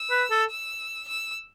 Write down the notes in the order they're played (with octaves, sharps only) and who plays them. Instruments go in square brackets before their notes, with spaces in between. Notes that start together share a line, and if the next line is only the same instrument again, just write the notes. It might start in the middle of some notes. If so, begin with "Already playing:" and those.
Already playing: [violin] E6
[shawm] B4
A4
[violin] E6
E6